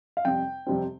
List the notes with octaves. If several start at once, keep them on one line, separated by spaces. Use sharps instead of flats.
F5
F2 C3 G3 C4 G5
F2 C3 G3 C4